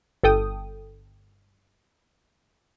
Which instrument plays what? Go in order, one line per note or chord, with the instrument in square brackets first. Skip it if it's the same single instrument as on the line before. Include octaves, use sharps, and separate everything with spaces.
[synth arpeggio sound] G1 A4 G5 D#6